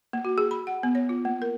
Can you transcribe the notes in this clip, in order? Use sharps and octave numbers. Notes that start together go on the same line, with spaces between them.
A#3
F#4
G#4
B5
F#5
B3
C#5
F4
A#3
A#4